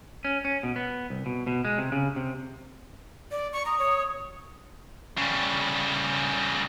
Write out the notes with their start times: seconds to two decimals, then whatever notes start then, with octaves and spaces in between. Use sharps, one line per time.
0.25 C#4
0.45 C#4
0.63 B2
0.76 B3
1.10 C2
1.26 B2
1.47 B2
1.65 G#3
1.78 C3
1.92 C#3
2.16 C3
3.31 D5
3.53 D5 C#6
3.65 A#5 D#6
3.79 C#5
5.18 C#3 G3